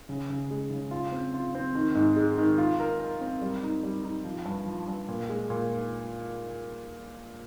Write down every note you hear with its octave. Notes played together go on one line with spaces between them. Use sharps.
C#3
C#3
G#3
C#3
F4
C4
F4
C4
D#3
G#2
G#3
D#3
F4
A#4
A#4
C4
G3
D#4
G3
D#4
F3
G2
F3
G2
A#2
G#3
A#2